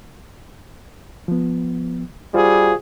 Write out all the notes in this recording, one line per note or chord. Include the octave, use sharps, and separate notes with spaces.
F3 B3
G3 F4 F#4 G#4 C5 F5